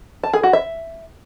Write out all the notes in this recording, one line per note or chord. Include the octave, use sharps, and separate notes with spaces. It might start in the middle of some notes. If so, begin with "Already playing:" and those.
A5
G#4
F#4
E5